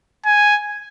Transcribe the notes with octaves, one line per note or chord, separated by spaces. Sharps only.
G#5